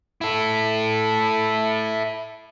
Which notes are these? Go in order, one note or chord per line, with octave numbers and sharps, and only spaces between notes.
E4 A4